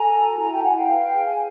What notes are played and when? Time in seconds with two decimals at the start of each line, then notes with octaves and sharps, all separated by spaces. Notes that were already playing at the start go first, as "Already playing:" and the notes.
Already playing: A4 G#5 A#5
0.15 F#4
0.39 E4 G#5 A#5
0.52 G5 A5
0.64 E4 F#5 G#5
0.76 F5 G5
0.88 B4
1.13 G#4
1.26 G#5